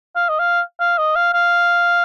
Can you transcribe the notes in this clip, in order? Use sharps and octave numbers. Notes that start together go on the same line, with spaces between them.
F5
D#5
F5
F5
D#5
F5
F5